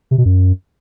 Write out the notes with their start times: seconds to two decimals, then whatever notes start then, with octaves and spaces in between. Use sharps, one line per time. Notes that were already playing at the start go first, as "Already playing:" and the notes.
0.11 C3
0.18 B2
0.25 F#2